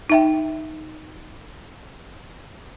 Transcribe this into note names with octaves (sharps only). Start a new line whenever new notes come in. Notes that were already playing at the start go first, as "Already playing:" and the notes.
D#4 E5 G5